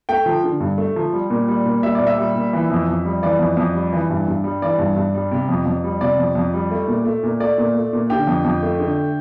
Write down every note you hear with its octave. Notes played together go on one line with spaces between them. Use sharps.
A3 G5
F3
D3
G2
A3
F3
G3
A#2
G3
A#2
G3 E5
A#2 D5
E5
G3
A#2
E3
F2
F2
G3
E3 D5
F2
F2
G3
E3
G2
G2
G3
E3 D5
G2
G2
G3
C3
F2
F2
G3
C3 D5
F2
F2
G3
A3
A#2
A3
A#2
A3 D5
A#2
A3
A#2
D3 G4
F2
F2
A3
D3